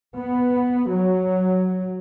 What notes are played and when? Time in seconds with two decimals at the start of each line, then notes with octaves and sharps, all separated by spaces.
0.17 B3
0.89 F#3